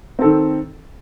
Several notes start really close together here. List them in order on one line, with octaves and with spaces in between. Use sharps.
C4 A4 D#3